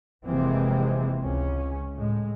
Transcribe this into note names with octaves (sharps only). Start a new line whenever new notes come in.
F1 C3 E3 G#3 A#3 C4
C#2 C#4
A2 G#3